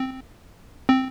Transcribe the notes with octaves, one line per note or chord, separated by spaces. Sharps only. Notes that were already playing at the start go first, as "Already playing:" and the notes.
Already playing: C4
C4